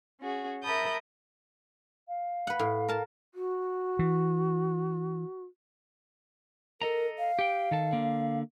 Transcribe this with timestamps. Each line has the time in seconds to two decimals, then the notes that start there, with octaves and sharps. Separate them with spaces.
0.20 C#4 F#4 G#4
0.63 A#4 E5 A5 B5 D#6 G6
2.08 F5
2.47 B4 F#5
2.59 A2
2.88 A#4 A5
3.35 F#4
3.99 E3
6.82 A4 A#4 D#5 A#5
7.19 F5
7.39 G4 G5
7.71 D#3 A4 A5
7.93 D3 A#3